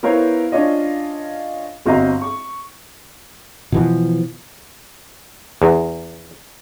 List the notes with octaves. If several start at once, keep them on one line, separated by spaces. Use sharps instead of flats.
B3 E4 A#4 C5 C#5 F5
C#4 D4 F4 C#5 D#5
G1 C4 F#4 D#5 F5 A#5
C#6
B2 E3 F3
E2